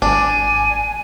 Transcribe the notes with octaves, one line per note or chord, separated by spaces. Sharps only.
G#1 D4 G#5